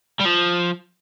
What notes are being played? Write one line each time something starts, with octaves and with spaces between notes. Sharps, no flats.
G3
F3